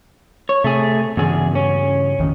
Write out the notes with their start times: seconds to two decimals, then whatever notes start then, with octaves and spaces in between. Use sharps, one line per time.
0.49 C#5
0.64 C3 A3 G#4
1.17 E2 G2 C#3 G#4
1.55 C#4
2.19 A1 F2 D#3